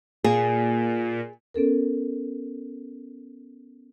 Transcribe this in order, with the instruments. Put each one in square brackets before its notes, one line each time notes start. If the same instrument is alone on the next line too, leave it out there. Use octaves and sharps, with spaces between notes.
[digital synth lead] A#2 [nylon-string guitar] G#4
[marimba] B3 C#4 A4 A#4